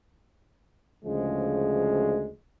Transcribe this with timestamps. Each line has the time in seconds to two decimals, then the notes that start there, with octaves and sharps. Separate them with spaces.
1.04 D2 C#3 F3 G#3